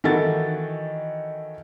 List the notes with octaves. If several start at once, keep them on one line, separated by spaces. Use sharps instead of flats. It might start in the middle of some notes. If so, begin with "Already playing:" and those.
D#3 E3 F#4 A4 A6